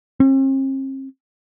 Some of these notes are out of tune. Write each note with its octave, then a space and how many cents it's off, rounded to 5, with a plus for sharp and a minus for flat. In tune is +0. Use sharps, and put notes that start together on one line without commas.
C4 +45